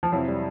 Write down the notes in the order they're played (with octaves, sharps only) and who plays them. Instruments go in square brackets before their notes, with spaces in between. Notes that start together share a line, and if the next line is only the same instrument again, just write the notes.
[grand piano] F3
[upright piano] F2 C3 E3 [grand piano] F#3
[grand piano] G3